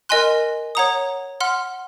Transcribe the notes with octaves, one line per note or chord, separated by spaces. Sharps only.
A#4 D#5 G#5 C6 F#6
C#5 F#5 A#5 D#6
F#5 C6 F6